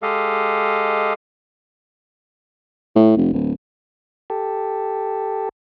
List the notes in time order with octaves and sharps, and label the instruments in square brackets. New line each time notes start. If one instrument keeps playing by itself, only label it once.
[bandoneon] G#3 G4 A4 D#5 F5
[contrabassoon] A2
F1
D1
[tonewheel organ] G4 A4